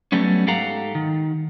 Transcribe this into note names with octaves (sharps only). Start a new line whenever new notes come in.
F#3 G3 A3 B3 C#4
G#2 G4 A4 F5 F#5 A#5
D#3